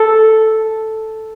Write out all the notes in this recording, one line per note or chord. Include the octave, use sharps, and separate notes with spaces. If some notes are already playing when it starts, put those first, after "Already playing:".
Already playing: A4